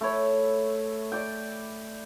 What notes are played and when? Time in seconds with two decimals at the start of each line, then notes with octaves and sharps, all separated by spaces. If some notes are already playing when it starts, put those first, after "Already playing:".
0.01 A3 E4 C#5
1.12 D5 G5